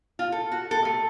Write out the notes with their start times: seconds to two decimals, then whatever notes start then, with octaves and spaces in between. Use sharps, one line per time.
0.19 F4
0.32 A4
0.52 F#4
0.71 A4
0.85 A3